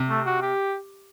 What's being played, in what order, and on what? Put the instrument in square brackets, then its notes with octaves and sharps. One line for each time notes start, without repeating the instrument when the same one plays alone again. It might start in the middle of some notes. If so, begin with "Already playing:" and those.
Already playing: [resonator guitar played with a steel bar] C3
[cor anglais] A3
F#4
G4